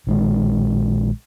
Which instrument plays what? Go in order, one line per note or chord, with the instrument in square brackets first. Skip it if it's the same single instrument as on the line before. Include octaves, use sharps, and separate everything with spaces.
[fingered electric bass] A#1 D#3 G#3